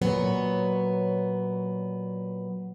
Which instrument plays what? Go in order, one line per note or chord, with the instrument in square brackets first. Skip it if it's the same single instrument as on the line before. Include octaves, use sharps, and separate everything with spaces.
[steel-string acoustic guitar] A#2 F#3 B3 C#5